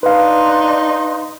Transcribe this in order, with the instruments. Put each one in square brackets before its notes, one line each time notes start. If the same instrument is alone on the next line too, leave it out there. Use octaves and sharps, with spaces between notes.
[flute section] D4 C6 [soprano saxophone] D#4 [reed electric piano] B4 F5